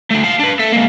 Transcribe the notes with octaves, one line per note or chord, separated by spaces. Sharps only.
A3 D4
F5 A5
D4 B4
A4 E5
G#3 A#3